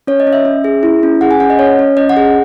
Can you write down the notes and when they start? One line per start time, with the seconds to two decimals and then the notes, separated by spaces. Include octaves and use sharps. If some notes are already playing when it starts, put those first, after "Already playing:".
0.07 C#4 C#5
0.20 D#5
0.27 C#4
0.33 E5
0.45 C#4
0.64 G#4
0.83 E4
1.03 C#4
1.21 G#4 F#5
1.31 G#5
1.40 C#4 F#5
1.50 D#5
1.59 C#4 C#5
1.79 C#4
1.97 C#4 D#5
2.09 F#5
2.17 G#4